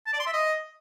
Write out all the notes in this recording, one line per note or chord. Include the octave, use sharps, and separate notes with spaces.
A5
D5
C6
E5
D#5